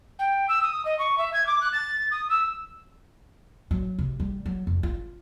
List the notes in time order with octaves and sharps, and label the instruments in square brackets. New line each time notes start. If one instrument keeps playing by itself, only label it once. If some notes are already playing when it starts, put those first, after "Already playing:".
[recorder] G5
E6
D#6
D#5
C#6
E5
G#6
D6
F#6
A6
D#6
E6
[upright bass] F#3
C3
G3
F#3
F1
F4